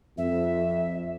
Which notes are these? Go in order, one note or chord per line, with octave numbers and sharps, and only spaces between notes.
F2 E5